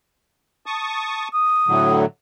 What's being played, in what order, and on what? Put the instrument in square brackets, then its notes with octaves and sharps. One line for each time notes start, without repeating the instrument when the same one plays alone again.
[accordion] A5 C#6 D#6
[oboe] D#6
[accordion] A2 D3 F#3